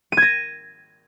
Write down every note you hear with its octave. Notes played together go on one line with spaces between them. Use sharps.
G#6 A#6 D#7